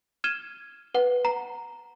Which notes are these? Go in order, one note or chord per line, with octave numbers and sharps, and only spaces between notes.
F6 G#6 D#7 E7 G7
B4 F#5
A#5